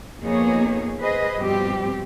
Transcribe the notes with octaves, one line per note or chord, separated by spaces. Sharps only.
F2 A#3 B3 D#4 G#4 C#5
G#4 B4 C5 D#5
G2 B2 F3 G3 C4 G4